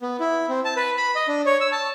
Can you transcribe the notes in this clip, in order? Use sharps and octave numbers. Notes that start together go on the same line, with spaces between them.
B3
E4
C4
A5
B4
B5
D#5
D4
C#5
E6
A5